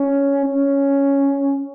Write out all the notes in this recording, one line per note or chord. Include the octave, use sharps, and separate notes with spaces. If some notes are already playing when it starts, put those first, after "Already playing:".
Already playing: C#4
C#4